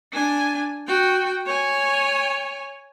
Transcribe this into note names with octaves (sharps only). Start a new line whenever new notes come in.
D4 G#5
F#4 G5
C#5 G#5